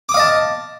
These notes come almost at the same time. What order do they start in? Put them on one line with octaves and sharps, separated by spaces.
D6 D#6 F5 D#5 A5